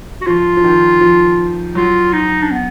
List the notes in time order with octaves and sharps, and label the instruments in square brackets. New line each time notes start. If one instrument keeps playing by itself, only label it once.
[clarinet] F#4
[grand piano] F3 [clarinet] F4
[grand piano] F3
D#3
F3
[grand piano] F#3 [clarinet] F4
[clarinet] D#4
D4
B3